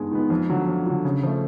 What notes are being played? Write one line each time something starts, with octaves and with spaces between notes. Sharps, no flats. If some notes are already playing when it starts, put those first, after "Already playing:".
Already playing: G2 D#3 G#3 B3
D#3 G#3 B3
F2
D3 F#3
F2
D3 F#3
C#3
F3 A3